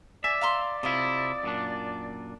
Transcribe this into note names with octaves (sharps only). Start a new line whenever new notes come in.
D5 E5 G#5
F5 A#5 C6
C3 E4 F4 D#5
F#2 A#2 D4